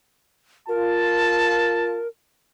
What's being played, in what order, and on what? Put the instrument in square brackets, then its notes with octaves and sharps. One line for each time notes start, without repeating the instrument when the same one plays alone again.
[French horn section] F4 [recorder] A#4 [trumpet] A5